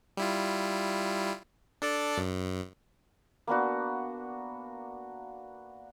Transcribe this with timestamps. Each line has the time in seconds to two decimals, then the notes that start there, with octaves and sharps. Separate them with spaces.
0.17 G3 E4 F4
1.82 D4 A4 D5
2.17 F#2
3.47 A#3 B3 D4 F#4